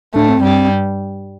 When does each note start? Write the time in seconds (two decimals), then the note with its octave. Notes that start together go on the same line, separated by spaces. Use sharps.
0.14 A2 A3 D4
0.29 C4
0.44 G2 G3